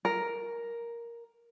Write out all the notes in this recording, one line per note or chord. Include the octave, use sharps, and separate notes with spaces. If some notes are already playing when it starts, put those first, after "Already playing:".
A#4